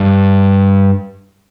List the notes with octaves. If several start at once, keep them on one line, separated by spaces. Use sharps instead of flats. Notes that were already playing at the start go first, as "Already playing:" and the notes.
Already playing: G2